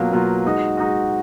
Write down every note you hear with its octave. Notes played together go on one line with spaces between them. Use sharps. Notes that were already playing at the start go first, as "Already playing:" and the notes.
Already playing: B2 F#3 A#3 F4
B2 F#3 A#3 F4
G#3 D#4 F#4
G#3 D#4 F#4